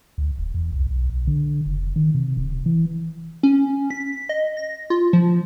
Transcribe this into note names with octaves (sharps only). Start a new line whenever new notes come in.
D2
D#1
E2
C2
B1
B1
D3
F1
D#3
C3
D1
E3
C#4
B6
D#5
A#6
F4
F3